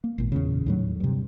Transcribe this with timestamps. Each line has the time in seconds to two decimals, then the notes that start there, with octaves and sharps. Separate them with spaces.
0.04 A#3
0.18 G#1 A#2
0.32 E2 A#2 C#3
0.66 D#2 A2 F#3
1.00 G2 C3